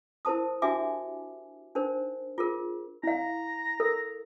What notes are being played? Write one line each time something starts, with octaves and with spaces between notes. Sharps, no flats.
E4 A#4 C5 A5 D#6
D4 F#4 G4 E5 G#5 D6
D4 D#4 A#4 C5
F4 G#4 A#4
E4 F5 A#5
A4 A#4